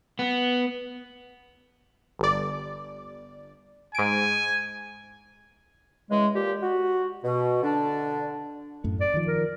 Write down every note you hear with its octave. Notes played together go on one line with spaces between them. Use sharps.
B3
G1 D5
G#2 G#5 D7
C#3 E3 G#3
A#2 G4
F#4
B2
D3 D4
F#2 A2 A3
D5
D#3 F3
A#4